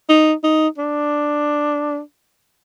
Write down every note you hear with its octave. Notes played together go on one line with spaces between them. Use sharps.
D#4
D#4
D4